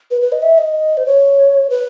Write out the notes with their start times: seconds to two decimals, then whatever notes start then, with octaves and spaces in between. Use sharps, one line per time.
0.11 B4
0.21 B4
0.32 D#5
0.42 E5
0.58 D#5
0.97 C5
1.06 C#5
1.70 B4